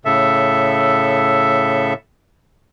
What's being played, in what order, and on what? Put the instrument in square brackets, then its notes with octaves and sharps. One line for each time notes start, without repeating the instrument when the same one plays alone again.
[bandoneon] A2 C#3 A4 E5